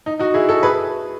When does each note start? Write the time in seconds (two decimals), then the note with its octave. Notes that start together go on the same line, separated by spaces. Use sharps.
0.06 D#4
0.19 D#4 F#4
0.34 E4 G#4
0.49 F#4 A4
0.63 G#4 B4